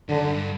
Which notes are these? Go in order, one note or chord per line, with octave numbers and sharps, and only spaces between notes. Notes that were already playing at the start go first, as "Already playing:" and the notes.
F#2 D3
G2